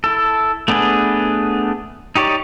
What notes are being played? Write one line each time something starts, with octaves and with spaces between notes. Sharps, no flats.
E4 A4
A3 B3 D4 G#4 B4
D#4 G4 C#5 D5